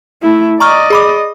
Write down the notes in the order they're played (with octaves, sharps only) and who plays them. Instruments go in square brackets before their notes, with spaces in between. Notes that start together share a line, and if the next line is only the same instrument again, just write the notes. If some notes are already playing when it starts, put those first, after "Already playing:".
[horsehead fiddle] A3 E4
[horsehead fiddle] D5 D#5 [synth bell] A#5 C#6 F6
[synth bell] G#4 B5 D6